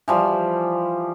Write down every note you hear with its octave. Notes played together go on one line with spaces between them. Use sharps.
E3 F3 G3